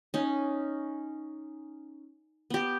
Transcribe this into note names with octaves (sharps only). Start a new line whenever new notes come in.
C#4 D#4
B3 G4